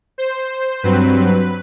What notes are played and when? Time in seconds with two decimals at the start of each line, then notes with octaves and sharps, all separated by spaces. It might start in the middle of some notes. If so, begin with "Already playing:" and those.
0.18 C5
0.83 G2 F#3 C4 B4